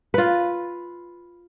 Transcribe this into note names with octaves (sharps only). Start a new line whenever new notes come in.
F4 B4